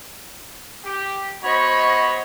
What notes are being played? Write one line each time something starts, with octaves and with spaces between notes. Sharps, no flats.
G4
B3 F#4 C5 C#5 D#5 B5